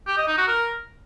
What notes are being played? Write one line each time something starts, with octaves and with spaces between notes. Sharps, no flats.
G4
D#5
D#4
F#4
A#4